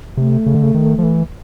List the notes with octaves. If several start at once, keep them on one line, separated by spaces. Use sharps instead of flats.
C3 A3
C#3
D3
C#3
D#3
F3
E3